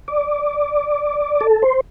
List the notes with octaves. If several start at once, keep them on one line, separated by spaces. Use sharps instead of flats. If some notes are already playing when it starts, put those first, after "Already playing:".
D5
A4
C5